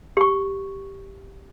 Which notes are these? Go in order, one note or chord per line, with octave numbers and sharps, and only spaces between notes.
G4 C#6